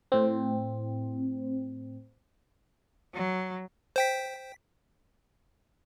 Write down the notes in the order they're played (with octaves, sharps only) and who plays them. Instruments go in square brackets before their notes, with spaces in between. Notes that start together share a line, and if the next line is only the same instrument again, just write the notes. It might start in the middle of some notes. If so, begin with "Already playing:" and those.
[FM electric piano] A2 C4
[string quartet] F#3
[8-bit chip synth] C5 G5 B6